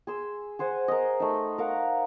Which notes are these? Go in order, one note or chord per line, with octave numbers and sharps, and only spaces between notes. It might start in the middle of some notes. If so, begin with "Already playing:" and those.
G#4 C6 E6
G#4 C5 F#5 G#5
A#4 D#5
A3 D#4
A#4 F5 F#5